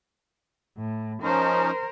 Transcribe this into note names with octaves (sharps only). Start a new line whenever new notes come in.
A2
F3 C#4 D#4 A#4 C5